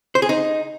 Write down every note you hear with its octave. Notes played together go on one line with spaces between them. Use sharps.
C5
G#4
D#4